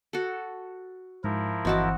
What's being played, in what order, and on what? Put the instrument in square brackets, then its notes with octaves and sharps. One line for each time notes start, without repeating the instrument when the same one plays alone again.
[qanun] F#4 A4
[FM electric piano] G#2 [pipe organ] F3 E4 A#4
[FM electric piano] G1 E3 D#5 [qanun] C4 F#4 A5